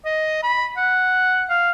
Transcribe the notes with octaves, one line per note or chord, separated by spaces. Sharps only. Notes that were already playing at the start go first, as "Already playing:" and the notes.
D#5
B5
F#5
F5